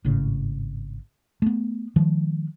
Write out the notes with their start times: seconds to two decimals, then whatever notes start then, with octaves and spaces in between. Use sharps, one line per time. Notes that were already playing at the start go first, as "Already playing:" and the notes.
0.04 G#1 A2 C#3
1.42 A3 B3
1.96 D#3 F3 G#3